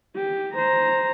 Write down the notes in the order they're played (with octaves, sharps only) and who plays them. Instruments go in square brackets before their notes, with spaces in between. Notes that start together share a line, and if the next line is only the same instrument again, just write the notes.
[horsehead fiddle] G4
C5 A#5